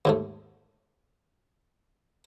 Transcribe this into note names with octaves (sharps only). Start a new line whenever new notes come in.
D#2 G#2 A3